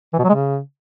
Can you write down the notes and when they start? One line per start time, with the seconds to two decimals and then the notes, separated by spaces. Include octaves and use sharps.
0.13 E3
0.19 B2
0.24 F#3
0.29 G#3
0.34 C#3